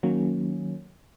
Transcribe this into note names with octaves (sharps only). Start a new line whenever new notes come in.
D#3 F#3 A#3 C#4